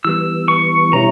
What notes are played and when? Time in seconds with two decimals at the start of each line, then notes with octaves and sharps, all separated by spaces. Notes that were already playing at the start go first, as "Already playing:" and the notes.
0.05 E3 G3 B3 E6
0.48 C#6
0.93 B2 G3 C#4 E4 A#5